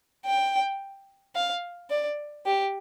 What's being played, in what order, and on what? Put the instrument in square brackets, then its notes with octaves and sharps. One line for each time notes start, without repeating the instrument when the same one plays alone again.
[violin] G5
F5
D5
G4